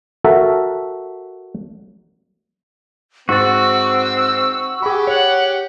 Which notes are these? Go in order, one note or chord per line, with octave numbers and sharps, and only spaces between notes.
F#4 A4 A#4 E5
G#2 C4 F#4 E6 A6
G4 G#4 F#5 B5
C#5 F#5